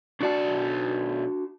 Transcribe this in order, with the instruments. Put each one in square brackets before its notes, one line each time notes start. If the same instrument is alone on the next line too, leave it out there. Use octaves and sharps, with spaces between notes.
[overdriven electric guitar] B1 D5 [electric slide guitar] D4 F#4 A5